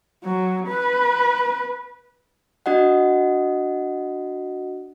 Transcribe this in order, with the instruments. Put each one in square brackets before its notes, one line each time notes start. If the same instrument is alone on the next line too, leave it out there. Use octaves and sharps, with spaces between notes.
[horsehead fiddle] F#3
B4
[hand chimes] D4 F#4 D#5 F#5